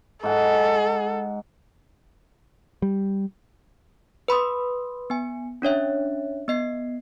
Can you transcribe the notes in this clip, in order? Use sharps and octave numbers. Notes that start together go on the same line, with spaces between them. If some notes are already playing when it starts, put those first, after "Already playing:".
G#2 A4 F#5 G#5
G3
B4 B5 C6 D#6
B3 G#5
C#4 D4 C#5 E5
B3 D#5 C7